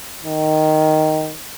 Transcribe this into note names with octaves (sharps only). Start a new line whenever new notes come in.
D#3